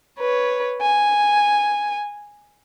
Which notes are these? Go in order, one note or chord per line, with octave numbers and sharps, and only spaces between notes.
B4 C#5
G#5